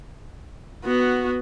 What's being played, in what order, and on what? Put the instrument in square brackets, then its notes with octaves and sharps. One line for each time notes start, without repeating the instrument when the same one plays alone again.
[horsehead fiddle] B3 F#4